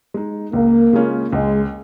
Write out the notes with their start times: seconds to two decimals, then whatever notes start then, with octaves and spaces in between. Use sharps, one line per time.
0.14 G#3 D#4
0.53 C#2 A#3
0.93 C#3 G#3 C#4 F4
1.33 C#2 G#3